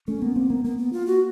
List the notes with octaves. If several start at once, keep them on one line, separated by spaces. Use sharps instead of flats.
A3 C#4
A#3 B3
A#3 C4
A#3 B3
A#3 B3
B3
F4
F#4